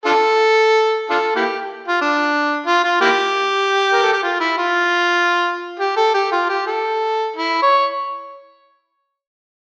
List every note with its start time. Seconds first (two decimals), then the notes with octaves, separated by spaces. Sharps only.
0.05 D4 F4 A4
1.10 D4 F4 A4
1.35 A#3 E4 G4
1.88 F4
2.01 D4
2.66 F4
2.84 F4
3.01 A#3 E4 G4
3.93 A#4
4.02 A4
4.13 G4
4.23 F4
4.40 E4
4.58 F4
5.79 G4
5.97 A4
6.14 G4
6.32 F4
6.49 G4
6.67 A4
7.36 E4
7.62 C#5